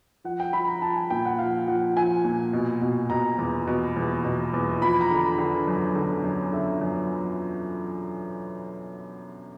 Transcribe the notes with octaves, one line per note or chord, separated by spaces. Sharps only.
F3 F#5
G5
F3 B5
A#5
F3 A5
G#5
A#2 G5
F#5
F3 F5
F3 F#5
F3 G#5
A#2
B2
B2
B2 A#5
E2
B2
E2
B2
E2
F3 B5
A#5
D3
D3
F#2
D3
F#2
D3 E5
F#2